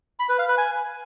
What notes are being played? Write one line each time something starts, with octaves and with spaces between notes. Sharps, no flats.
B5
B4
F5
B4
G#5